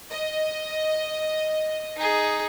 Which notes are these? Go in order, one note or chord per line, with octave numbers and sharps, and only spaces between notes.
D#5
D#4 G#4